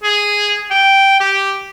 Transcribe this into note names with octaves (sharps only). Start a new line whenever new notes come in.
G#4
G5
G4